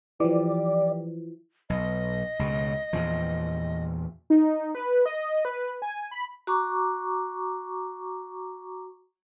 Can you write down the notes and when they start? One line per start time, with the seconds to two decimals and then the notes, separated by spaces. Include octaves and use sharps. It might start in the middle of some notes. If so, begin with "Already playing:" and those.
0.20 E3 F3 G3 D5
1.70 B1 D#5
2.39 C#2 B2
2.93 E2 A#2 F3
4.30 D#4
4.75 B4
5.06 D#5
5.45 B4
5.82 G#5
6.11 B5
6.47 F#4 A#5 C#6 D6